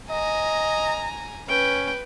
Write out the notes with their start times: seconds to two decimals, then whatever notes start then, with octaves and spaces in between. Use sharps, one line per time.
0.11 D#5 G#5 A#5
1.48 C#4 B4 G5